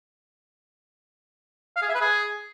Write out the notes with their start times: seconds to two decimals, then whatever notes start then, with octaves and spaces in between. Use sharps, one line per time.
1.76 F5
1.82 G#4
1.88 E5
1.95 B4
2.01 G#4